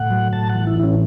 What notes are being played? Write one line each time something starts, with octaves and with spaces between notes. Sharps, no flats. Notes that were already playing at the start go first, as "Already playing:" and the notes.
Already playing: A2 F#5
F#3
A2 A5
F#5
E3
E4
A2 E4
C#4